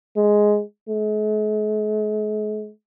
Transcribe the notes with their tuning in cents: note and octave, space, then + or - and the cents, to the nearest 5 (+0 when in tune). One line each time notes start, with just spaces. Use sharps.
G#3 +5
G#3 +45